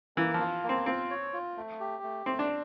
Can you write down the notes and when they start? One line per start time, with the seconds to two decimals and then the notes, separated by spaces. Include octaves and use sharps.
0.17 E3 A#3
0.34 F3
0.40 F4
0.63 A#3
0.69 C4
0.86 C4 F4
1.11 C#5
1.33 F4
1.57 A3
1.80 G4
2.03 A3
2.26 A3 C4
2.39 D4